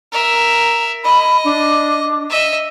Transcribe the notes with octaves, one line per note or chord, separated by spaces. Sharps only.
A#4 E5
D#5 B5
D4
D#5 E5